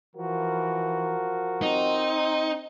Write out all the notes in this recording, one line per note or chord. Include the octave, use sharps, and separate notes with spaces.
E3 F3 F#4 A#4
C4 D#4